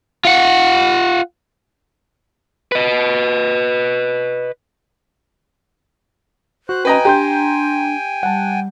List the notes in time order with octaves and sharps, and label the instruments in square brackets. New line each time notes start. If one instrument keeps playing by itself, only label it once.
[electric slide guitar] F4 F#5
[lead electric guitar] B4 D#5
[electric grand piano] F#4 [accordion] C5 F#6
[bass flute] C#4 [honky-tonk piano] B4 D#5 A#5 [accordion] G5 G#5
[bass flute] D4 [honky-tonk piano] G4 [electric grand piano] A#5 C6 G6
[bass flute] G3 [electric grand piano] F#5 A5